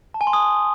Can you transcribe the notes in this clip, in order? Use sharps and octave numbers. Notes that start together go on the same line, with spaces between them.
A5
G#5
C6
D#6